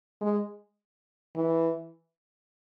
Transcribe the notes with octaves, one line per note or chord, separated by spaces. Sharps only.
G#3
E3